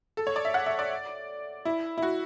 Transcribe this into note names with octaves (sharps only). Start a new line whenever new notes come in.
A4
C#5
D5
E5
F#5
E5
D5
E4
E4
F#4